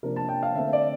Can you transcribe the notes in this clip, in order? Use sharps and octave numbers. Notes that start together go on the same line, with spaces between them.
C3 F3 A#3 D4 A#4
A5
G5
F5
D3 A3 C4 E5
D5